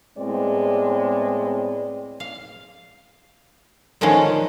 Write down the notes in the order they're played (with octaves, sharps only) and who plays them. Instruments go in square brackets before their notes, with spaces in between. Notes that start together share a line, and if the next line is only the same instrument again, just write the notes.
[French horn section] A2 G#3 B3 C4 D5
[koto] F5
D3 D#3 F3 G#3 C#4